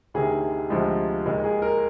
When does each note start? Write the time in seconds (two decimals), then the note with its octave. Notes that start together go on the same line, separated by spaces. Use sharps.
0.14 D2 C3 D#3 G#4
0.70 D2 C3 F3 G#3
1.26 D#2 D#3 G#3
1.44 G#4
1.62 A#4